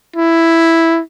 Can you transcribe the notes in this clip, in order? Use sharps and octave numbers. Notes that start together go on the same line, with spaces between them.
E4